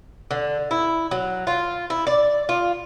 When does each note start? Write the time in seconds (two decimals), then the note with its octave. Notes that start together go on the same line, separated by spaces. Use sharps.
0.31 D3
0.71 E4
1.11 F#3
1.47 F4
1.90 E4
2.07 D5
2.49 F4